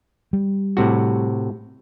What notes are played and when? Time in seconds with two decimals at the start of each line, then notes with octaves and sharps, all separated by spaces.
0.33 G3
0.77 A2 C3 F#4